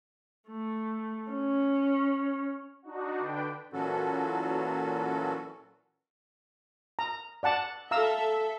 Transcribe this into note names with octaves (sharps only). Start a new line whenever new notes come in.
A3
C#4
D4 D#4 F#4
D3 D4 B4 G5
A#2 E3 F#3 C#4 F#4 A4
A#5
D5 F#5 A5
A4 E5 F5 A#5 E6